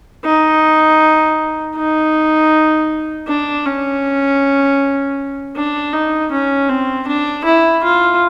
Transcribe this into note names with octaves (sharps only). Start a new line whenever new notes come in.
D#4
D#4
D4
C#4
D4
D#4
C#4
C4
D4
E4
F4